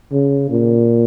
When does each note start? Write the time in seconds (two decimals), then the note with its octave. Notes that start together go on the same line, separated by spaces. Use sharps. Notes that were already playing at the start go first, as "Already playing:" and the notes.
0.12 C#3
0.51 A#2